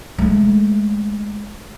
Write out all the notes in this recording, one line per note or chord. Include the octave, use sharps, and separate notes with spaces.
G#3 A3